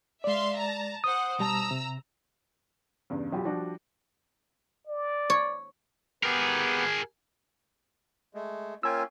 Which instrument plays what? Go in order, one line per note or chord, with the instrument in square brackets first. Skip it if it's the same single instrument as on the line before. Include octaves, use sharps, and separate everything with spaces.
[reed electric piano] G#3 D5 [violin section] E5 F5 C6
[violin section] A5 A#5
[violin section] C5 F#5 [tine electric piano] D#6
[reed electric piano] B2 G3 A5 [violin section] A#5 E6
[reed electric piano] C3
[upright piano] E2 G2 C#3
[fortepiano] B1 F4 G4
[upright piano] F3 G3 [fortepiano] D4 F#4
[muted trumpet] D5
[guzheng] C#5
[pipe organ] B3 G4 [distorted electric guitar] G#4 A#4
[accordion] G#3 A3
[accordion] A#3 C#4 F4 [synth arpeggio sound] G5 G#5 E6